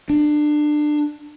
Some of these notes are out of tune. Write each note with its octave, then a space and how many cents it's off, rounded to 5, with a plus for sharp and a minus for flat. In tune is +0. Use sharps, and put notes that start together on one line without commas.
D4 +25